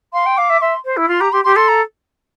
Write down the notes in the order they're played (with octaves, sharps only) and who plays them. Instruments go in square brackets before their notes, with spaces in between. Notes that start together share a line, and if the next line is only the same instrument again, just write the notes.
[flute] F5 [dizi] C6
[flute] G5
[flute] F5 [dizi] D6
[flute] E5
[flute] E5 [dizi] C6
[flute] C5
E4
[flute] F4 [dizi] C6
[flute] G4 [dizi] A#5
[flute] G4 [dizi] C6
[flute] G4 [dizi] C6
[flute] A4 [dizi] C6
[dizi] A#5